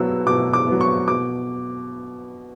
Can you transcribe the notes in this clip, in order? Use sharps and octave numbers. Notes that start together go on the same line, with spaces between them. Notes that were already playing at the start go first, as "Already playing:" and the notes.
Already playing: B2 F#3 B3 E6
B2 D6
D6
F#3 B3
C#6
B2 D6